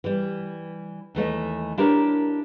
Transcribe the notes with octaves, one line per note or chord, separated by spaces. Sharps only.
E3 G3
D#2 E3 A3 D#5
D4 E4 G4 A#4 C#5